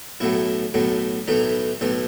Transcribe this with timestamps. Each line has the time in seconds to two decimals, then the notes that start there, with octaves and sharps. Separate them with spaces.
0.20 B1 A2 F#3 A3 E4
0.74 B1 A2 F#3 A3
1.28 B1 A2 E3 A3 D#4
1.81 B1 A2 E3 A3